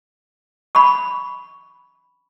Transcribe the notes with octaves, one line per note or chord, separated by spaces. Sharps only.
B5 C#6